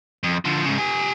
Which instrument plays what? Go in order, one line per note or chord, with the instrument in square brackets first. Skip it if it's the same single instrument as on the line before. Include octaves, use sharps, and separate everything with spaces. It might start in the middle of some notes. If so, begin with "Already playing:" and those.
[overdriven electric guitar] F2
D3 F3
G#2 C#3
G4 G#5